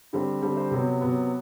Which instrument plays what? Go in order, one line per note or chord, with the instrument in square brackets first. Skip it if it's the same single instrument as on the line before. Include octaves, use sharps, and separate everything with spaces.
[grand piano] D3 G3 C4
D3 G3 C4
C5
C3 F#3 B3
C3 F#3 B3